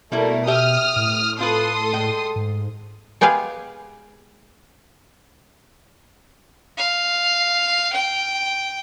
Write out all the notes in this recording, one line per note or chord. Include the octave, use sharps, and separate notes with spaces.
B2 G3 A3 A#3 E4 A#4
G4 E5 D#6 F6
A2
C4 F4 A4 B4 C6 D#6
G#3 G5
G#2
G#3 B3 G4 G#4 F5
F5
G5